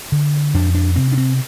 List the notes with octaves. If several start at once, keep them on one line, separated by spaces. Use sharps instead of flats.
D3
F2 D4
D4
C3 C4
D4
C4